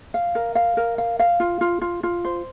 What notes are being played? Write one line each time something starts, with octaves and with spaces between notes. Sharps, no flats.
F5
A#4
F5
A#4
F5
F5
F4
F4
F4
F4
C5